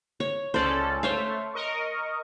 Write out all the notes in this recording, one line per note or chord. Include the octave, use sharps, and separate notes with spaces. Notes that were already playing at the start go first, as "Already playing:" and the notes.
C#5
C#2 C#4 A4 C5 D5
A3 C5 C#5 F5
A#4 D#5 C#6